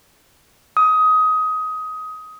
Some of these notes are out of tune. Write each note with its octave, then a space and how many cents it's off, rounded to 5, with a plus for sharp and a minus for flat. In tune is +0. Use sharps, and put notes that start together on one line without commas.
D#6 +20